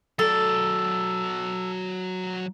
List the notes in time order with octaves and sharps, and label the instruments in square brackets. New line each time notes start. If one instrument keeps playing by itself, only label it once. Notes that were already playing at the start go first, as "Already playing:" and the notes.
[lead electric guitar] F#3 D5 [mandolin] A4